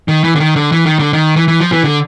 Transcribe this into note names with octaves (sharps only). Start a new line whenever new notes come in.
D#3
E3
D3
D#3
D3
E3
D#3
D3
D#3
E3
E3
F3
E3
D3